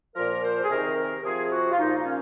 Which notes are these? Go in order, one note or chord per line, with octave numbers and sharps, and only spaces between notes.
A#2 F3 A#4
C5
G#4
C3 D#3 A#4
A#4
C3 F3 G#4
G#4
F#4
F4
A#2 F3 D#4
D#4
C#4